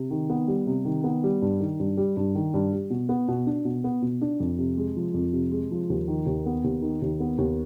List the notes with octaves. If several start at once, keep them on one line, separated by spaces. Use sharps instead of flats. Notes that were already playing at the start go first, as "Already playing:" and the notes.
Already playing: C3
D#3
B3
G3
C3
D#3
B3
G3
G2
D#3
G2
G3
G2
D#3
G2
G3
B2
B3
B2
D4
B2
B3
B2
D4
F2
C3
G#3
F3
F2
C3
G#3
F3
D#2
D#3
D#2
B3
D#2
D#3
D#2
B3
D#2